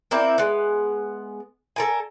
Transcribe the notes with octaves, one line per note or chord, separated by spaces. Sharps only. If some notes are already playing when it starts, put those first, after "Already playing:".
A#3 C4 E4 D5
G#3 B3
A4 A#4 G#5